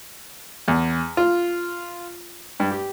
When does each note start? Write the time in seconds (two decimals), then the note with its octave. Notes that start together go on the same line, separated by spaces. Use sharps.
0.68 E2
1.17 F4
2.60 G2
2.71 G4